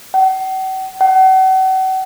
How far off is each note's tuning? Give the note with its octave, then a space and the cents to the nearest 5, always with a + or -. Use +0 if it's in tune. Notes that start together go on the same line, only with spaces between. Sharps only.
F#5 +45
F#5 +40